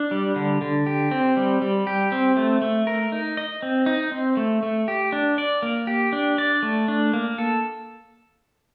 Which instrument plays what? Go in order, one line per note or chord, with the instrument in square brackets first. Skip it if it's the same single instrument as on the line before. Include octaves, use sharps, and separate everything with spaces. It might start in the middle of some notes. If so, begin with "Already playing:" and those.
Already playing: [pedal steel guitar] D4
G3
D3
D3
G4
C4
G3
G3
G4
C4
A3
A3
A#4
D#4
D#5
C4
D#4
C4
A3
A3
G4
D4
D5
A#3
G4
D4
D5
A3
D4
A#3
A4